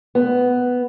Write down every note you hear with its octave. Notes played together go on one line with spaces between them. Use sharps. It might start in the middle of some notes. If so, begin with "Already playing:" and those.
B3